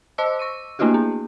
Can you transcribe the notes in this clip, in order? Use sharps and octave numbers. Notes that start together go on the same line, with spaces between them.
C5 D#5 A5 D6 E6
C#6 E6 D#7
A3 A#3 D4 E4 F#4 G4
B3